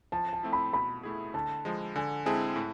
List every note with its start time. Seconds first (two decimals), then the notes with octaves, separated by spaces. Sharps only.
0.12 F3 A5
0.33 A5
0.43 A3 C4 E4
0.53 B5
0.73 B2 B5
1.03 A3 E4 G#4
1.34 D3 A5
1.65 F3 G#3
1.96 D3 G#5
2.26 G#3 C4 E4 G#4 A5
2.56 A2